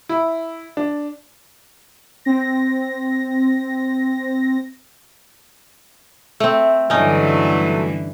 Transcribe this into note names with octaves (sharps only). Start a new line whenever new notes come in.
E4
D4
C4 A#6
A3 C4
G2 D3 E3 F#3 A3 C#4 D#4